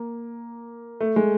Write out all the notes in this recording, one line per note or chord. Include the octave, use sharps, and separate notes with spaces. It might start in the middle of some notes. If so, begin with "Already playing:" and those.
Already playing: A#3
A3
G#3